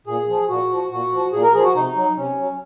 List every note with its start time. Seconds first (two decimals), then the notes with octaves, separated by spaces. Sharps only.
0.07 A#2 G#4
0.28 F3
0.49 A#2 F#4
0.70 F3
0.91 A#2 F#4
1.12 F3
1.33 A#2 G#4
1.43 A#4
1.54 F3 G#4
1.64 F#4
1.75 C3 D#4
1.96 F#3
2.16 C3 C#4
2.38 F#3